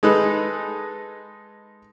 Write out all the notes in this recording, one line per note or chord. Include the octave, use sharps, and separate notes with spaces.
G#3 D#4 A4 B4